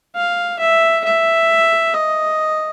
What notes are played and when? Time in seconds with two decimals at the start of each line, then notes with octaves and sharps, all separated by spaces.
0.16 F5
0.60 E5
1.04 E5
1.93 D#5